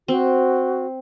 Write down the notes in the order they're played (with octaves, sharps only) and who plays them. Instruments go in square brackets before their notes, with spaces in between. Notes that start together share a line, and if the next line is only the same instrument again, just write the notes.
[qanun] C4 [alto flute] F#4